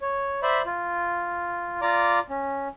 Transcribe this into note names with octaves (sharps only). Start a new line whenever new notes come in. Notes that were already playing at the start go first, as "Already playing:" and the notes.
C#5
C5 D5 E5 B5
F4
F4 D5 A#5 D6
C#4